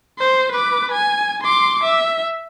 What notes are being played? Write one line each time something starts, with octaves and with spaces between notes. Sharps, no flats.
C5
B4 D6
G#5
C6 D6
E5